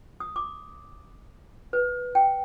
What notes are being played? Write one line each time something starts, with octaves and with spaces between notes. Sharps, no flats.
D#6
D6
B4
G5